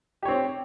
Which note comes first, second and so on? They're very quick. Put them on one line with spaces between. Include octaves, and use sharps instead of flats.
G4 C#5 C4